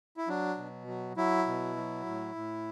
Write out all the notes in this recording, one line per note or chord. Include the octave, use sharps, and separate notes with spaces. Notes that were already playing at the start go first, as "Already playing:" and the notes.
E4
F#3 D4
B2
F#3
F#3 E4
B2
F#3
A2
A2